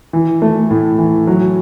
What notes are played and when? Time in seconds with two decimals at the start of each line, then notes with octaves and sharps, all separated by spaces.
0.13 E3
0.42 A3
0.70 A2
0.98 E3
1.27 F#3